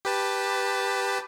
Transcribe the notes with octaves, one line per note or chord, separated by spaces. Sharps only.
G4 B4 A5